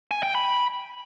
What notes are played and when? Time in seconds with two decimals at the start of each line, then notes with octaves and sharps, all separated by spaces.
0.11 G#5
0.23 G5
0.35 B5